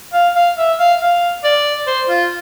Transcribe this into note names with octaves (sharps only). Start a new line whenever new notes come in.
F5
F5
E5
F5
F5
D5
C5
F4